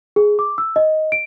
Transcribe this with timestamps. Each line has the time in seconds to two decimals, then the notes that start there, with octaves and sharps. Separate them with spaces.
0.16 G#4
0.39 D6
0.58 E6
0.76 D#5
1.12 D7